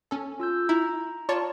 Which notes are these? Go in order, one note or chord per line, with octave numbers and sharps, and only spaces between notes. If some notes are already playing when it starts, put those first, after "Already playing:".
C#4 A4
F4 E6 G6
E4 A#5
F4 C#5 D5 A5